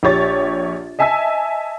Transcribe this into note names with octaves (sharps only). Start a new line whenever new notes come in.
A#1 G4 C#5 A6
D#5 E5 G#5 A5 E6 B6